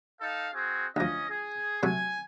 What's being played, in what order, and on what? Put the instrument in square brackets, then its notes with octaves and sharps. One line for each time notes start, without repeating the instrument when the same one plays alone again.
[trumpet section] D#4 A4 F5
C4 F#4 G#4
[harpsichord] D2 F3 [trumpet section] C#4 D#5
[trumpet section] G#4
[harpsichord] C3 F#3 A3 [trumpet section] G#5